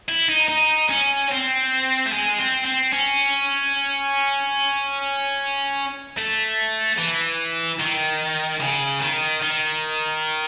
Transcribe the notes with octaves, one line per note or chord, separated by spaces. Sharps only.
E4
D#4
D#4
C#4
C4
A3
G#3
C4
C4
C#4
A3
E3
D#3
C#3
D#3
D#3